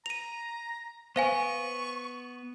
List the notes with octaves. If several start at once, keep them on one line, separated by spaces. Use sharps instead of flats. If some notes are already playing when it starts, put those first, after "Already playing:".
A#5 D#7 F7
B3 C5 F5 G#5 C#6